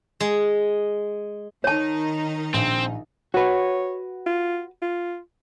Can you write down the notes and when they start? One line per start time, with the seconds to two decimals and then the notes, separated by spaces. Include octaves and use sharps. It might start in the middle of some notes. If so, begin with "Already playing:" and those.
0.20 G#3
1.64 D#3 D#4 C#5 A5
2.54 A#1 C4
3.34 F#4 B4 C#5
4.26 F4
4.82 F4